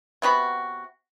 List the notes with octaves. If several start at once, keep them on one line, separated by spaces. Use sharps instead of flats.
C3 B3 F#4 B5